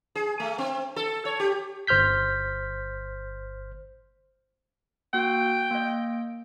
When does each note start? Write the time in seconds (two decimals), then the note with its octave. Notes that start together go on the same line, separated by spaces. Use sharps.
0.15 G#4
0.40 A3
0.58 C4
0.96 A4
1.25 C#5
1.40 G4
1.87 G1 C5 F6 G6 B6
5.13 A#3 F#4 G5
5.71 A#3 D#5